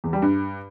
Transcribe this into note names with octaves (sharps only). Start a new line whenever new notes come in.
E2
G3
G2